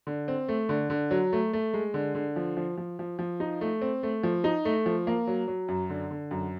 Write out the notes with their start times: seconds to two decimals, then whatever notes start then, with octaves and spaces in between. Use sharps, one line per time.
0.07 D3
0.28 C4
0.49 A3
0.69 D3
0.90 D3
1.11 F#3
1.33 A3
1.53 A3
1.74 G#3
1.94 D3
2.15 D3
2.36 F3
2.57 F3
2.78 F3
2.99 F3
3.19 F3
3.40 D#4
3.61 A3
3.82 C4
4.03 A3
4.23 F3
4.44 D#4
4.65 A3
4.86 F3
5.07 A#3
5.27 F#3
5.48 F#3
5.68 F#2
5.90 D3
6.11 D3
6.31 F#2